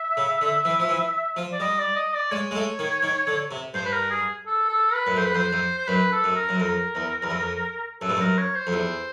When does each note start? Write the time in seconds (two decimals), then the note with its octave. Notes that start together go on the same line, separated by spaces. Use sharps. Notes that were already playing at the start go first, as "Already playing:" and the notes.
Already playing: E5
0.17 C#3
0.41 D3
0.65 E3
0.80 F3
0.89 E3
1.37 F3
1.52 D5
1.60 G3 D#5
1.79 D5
1.96 D#5
2.14 D5
2.32 G#3 C#5
2.51 G#3
2.55 A3
2.79 D#3
3.03 D#3
3.27 D3
3.51 C3
3.74 G2 C5
3.86 B4
3.92 A#4
4.10 G#4
4.46 A4
4.69 A4
4.93 B4
5.07 F#2
5.17 F2 C5
5.25 B4
5.34 F2 C5
5.53 F2
5.78 C5
5.88 F#2 B4
6.12 A4
6.24 F#2
6.36 A#4
6.49 F#2
6.59 F2 A#4
6.95 E2
7.23 E2
7.30 F2
8.02 F#2 A4
8.10 G2
8.17 F#2 A#4
8.38 C#5
8.55 C5
8.67 F2
8.73 E2